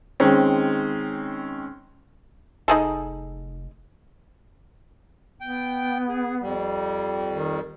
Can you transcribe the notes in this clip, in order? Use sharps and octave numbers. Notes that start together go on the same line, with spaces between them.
D#3 G#3 C4 C#4
F1 D#4 G#4 A4
B3 G5
G#4
F2 G3
D#3